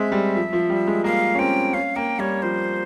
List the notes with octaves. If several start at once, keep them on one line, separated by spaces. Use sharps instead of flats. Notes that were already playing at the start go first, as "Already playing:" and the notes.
Already playing: G#3 C4 E5
G3
F3
F3
G3
G#3
A#3 F5
C#4
C4 G5
C#4 F5
A#3 G5
G3 C#5
F3 C5